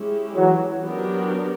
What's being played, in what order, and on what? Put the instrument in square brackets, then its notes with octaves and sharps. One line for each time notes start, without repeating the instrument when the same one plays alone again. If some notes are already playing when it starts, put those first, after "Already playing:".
Already playing: [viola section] G#3 C#4 E4 G4
[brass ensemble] E3 F#3
[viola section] F#3 B3 D4 G4 A#4